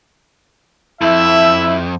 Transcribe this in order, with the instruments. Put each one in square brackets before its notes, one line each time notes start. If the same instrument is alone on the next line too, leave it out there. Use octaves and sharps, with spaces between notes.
[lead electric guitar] F2 [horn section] E4 [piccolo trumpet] E5